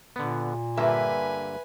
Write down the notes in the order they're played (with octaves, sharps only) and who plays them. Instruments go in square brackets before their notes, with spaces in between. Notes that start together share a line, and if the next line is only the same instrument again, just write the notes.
[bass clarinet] A#2 [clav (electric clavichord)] D3 B3
[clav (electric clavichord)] G2 D3 A#3 [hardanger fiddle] B4 G#5 [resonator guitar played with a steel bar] E5